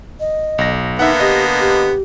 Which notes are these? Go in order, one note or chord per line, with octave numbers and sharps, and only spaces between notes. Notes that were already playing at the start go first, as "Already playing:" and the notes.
D#5
B1 A#6
D3 A#3 B3 D#4 E5 F#5
G4 D#5
G4